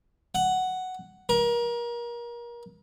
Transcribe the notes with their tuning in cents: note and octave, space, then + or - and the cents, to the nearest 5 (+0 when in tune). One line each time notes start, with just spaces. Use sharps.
F#5 +5
A#4 +30